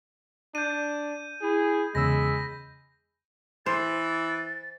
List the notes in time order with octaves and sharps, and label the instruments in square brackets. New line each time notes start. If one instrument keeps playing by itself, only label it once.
[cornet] D4 [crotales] G6 D#7
[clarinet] E4 [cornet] G#4
[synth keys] E2 C#3 E6 [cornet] G#3 [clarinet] B5 [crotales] A#6
[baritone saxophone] E3 [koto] C5 [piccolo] A6